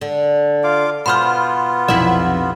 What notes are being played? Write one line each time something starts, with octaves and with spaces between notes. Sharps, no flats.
D3
F4 F5 D6
B2 B3 F4 C5 B5 C6 F6
B1 F2 C3 E4 E5 F#5